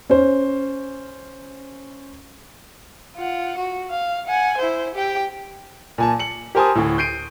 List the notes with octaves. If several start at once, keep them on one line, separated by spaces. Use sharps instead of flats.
C#4 C5
F4 F#5
F#4
F5
F#5 G#5
E4 C5
G4 G5
A#2 G#5 A5
C#7 F#7
G4 A#4 C5 G#5 A5 D#6
D2 A2
G6 C7 D7 D#7